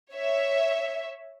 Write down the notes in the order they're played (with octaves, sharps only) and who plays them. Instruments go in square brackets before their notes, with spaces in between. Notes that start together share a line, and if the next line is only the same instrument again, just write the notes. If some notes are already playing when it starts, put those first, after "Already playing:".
[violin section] C#5 E5